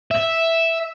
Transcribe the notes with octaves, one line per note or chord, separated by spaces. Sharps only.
E5